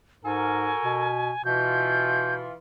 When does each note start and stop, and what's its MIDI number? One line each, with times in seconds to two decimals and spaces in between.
0.24 0.70 44
0.24 1.08 66
0.24 1.08 69
0.24 1.08 70
0.24 1.45 80
0.85 1.31 47
1.45 2.50 47
1.45 2.55 52
1.45 2.55 65
1.45 2.34 91